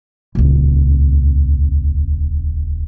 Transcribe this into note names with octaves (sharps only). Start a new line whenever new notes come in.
D#1 C#2